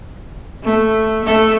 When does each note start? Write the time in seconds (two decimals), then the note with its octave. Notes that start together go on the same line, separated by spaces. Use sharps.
0.64 A3
1.25 A3 A4